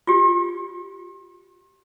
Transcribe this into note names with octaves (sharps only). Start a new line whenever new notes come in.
F4 G4